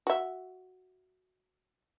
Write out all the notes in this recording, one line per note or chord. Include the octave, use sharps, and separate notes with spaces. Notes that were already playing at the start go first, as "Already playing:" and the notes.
F#4 E5